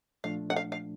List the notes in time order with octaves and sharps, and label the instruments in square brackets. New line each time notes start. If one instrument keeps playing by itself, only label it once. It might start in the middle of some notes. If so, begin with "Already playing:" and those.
[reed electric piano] A#2 F3 A3 D4 [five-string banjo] F5
[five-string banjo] F#5
F5
F5